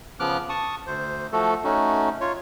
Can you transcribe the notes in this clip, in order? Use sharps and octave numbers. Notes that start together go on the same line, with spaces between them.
C#3 F3 B3 D6 F6 F#6
A5 C#6 D#6
D2 C5
F3 A3 F#4 A4
A3 C#4 D#4 F#4
F4 C#5